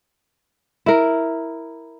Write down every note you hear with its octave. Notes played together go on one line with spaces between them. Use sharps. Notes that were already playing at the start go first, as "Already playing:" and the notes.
E4 A#4